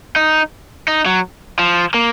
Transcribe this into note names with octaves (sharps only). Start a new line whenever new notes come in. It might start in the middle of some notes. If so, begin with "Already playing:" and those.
D#4
D#4
F#3
F3
A#3